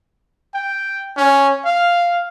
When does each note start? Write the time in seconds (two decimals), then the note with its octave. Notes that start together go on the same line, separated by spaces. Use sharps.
0.54 G5
1.17 C#4
1.65 F5